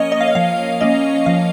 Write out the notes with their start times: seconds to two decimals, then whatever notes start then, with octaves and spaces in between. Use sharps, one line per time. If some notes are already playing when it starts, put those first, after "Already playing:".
Already playing: F3 A#3 C#4 A#4 C#5 D#5
0.12 D#5
0.21 F5
0.28 D#5
0.35 F3 F5
0.81 A#3 C#4 D#5
1.26 F3 F5